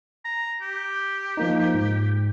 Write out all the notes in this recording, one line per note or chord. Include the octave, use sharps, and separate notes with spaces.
A#5
G4
F3 A#3 D#4
G#2